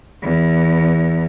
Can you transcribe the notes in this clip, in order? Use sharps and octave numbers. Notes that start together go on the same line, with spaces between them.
E2